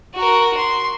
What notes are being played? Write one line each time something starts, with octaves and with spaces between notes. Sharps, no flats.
F#4 A#4
C6